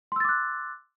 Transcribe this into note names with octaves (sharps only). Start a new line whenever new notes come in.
C6 D6 E6 F#6 A6